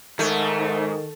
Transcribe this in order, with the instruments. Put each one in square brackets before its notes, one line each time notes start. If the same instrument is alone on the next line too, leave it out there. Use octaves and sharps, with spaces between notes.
[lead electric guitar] G#2 [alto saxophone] D#3 [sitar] A3